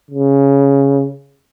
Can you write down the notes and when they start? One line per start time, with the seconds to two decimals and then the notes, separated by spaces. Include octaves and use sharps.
0.11 C#3